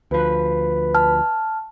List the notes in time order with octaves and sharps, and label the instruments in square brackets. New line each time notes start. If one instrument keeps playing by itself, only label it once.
[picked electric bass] D2 F3 [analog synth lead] B4
[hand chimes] A5 F6